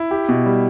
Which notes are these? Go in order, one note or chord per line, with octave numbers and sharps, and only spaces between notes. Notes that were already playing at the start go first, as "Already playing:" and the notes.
Already playing: E4
G4
B2
G3